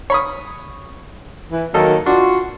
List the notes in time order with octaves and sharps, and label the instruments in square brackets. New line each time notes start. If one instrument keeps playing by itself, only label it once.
[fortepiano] C#5 B5 D#6
[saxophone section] E3
[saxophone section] D#3 F#3 A#3 [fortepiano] D#4 A4
[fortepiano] D4 [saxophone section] F4 F#4